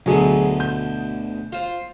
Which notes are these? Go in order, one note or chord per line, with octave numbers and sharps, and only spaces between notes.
D2 B2 D3 F#3 G#4
G6
F4 C5